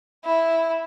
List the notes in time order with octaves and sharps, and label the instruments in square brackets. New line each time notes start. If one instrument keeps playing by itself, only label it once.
[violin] E4